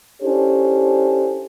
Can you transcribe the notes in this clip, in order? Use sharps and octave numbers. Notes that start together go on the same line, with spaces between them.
C#4 D4 E4 G4 A4 C5